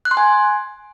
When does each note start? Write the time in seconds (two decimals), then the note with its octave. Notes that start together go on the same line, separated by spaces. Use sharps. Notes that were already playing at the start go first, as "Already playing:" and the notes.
0.05 F#6
0.11 C6
0.17 G#5